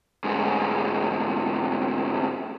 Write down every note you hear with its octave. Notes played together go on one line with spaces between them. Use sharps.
D2 G#2